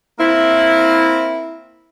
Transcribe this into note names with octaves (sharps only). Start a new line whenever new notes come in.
A#3 C4 E4